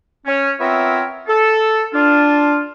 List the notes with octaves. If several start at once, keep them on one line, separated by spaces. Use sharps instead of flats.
C#4
B3 C4 F4 A#4 C#5 E5
A4
D4 F4